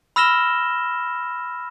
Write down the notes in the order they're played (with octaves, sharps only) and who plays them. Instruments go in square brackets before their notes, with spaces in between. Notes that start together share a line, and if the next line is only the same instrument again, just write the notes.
[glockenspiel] B5 E6 F6 A#6 E7 G7